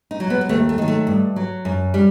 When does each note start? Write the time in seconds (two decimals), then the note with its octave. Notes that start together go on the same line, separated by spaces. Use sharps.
0.11 D#4
0.20 F#3
0.30 B3
0.41 B3
0.49 D#2 A3
0.69 A3
0.78 D#3 F#3
0.88 A3
1.07 G2
1.36 F#3
1.65 F#2
1.94 G3